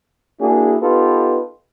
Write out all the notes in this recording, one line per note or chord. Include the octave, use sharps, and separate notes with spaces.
A#3 D4 E4 F#4 G#4
B3 D#4 F4 G4 A4 B4